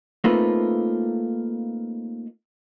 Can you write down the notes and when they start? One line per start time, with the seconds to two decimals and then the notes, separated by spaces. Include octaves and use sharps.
0.24 A3 A#3 C4 D#4 F4 B4